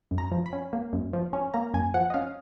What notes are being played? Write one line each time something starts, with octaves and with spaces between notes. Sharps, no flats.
F#2
A#5
F3
B5
C#4
A#3
F#2
F3
C#4
A#3 A#5
F#2 G#5
F3 F#5
D#5
C#4 F5